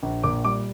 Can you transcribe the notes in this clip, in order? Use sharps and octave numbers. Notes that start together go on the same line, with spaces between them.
A#1
A#2 D6
G3 D6